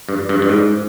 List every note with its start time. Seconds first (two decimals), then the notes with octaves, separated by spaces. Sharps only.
0.09 G2
0.29 G2
0.42 G2
0.49 G#2